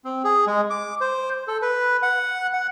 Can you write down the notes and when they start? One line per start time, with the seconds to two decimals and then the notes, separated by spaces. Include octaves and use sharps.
0.05 C4
0.24 G#4
0.47 G#3
0.70 D6
1.01 C5
1.48 A4
1.62 B4
2.03 F#5
2.53 F#5